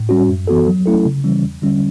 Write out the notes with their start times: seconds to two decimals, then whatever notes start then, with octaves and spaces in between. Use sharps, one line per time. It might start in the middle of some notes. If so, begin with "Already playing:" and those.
Already playing: A2
0.09 G3 C#4 F#4
0.29 F#2
0.47 E3 B3 F#4 A4
0.67 F#3
0.86 A3 C#4 E4 A4
1.05 C#3
1.24 E3 G3 C#4
1.43 E2
1.62 D3 G3 C#4